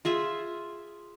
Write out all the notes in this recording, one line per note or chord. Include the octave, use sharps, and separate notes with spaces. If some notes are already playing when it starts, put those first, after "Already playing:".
F4 G#4 E5